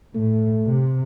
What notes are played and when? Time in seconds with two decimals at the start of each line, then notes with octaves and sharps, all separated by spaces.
0.15 A2 A3
0.65 C3